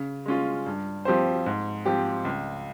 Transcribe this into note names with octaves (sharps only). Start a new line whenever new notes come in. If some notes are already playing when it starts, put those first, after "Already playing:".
Already playing: C#3
G#3 C#4 F4
G2
F3 C4 G4 C5
G#2
F3 C4 G4
C#2